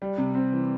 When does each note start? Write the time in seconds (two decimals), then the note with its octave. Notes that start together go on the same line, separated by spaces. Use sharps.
0.02 G3
0.18 C3
0.35 C4
0.52 E3